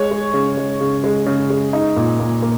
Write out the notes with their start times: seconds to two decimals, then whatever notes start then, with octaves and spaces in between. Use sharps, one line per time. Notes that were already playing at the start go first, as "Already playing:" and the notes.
Already playing: G#3 C#5
0.11 G#3
0.34 C#3
0.57 G#3
0.81 C#3
1.04 G#3
1.26 C#3
1.50 G#3
1.73 D#4
1.96 A#2
2.20 A#2
2.42 A#3